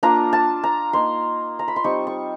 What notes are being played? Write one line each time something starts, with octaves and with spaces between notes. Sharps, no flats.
A#3 D4 F4 A#5
A5
A#5
A#3 D#4 C6
A#5
B5
C6
G3 C4 D#4 C#6
C#6